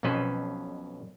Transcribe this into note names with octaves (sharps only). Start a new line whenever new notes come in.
B1 F2 B2 C#4 B4 C5